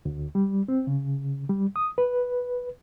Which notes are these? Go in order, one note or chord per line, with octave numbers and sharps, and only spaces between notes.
D2
G3
C4
C#3
G3
D#6
B4